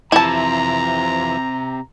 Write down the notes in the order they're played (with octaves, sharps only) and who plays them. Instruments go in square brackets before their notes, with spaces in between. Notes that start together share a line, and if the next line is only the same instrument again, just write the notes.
[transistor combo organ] F2 E3 [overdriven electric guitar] C3 [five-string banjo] E4 A5 [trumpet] A#5